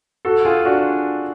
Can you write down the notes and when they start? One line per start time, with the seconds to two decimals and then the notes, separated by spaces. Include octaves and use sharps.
0.25 F#4 A4
0.45 F4 G#4
0.65 D4 F#4